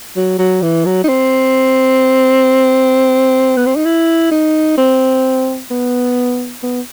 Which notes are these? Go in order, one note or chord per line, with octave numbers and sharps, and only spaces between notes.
F#3
F#3
E3
F#3
D#4
C4
B3
C4
D#4
E4
D#4
C4
B3
B3